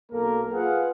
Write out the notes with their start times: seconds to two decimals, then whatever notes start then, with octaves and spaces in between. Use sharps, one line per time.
0.12 B1 A#3 A4 A#4
0.53 F4 G#4 B4 F5 F#5